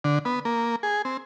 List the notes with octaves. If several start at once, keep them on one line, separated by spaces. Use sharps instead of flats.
D3
B3
A#3
G#4
C4